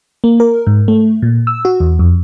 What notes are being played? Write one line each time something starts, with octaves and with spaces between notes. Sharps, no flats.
A#3
A#4
G#2
A3
A#2
E6
F#4
E2
F2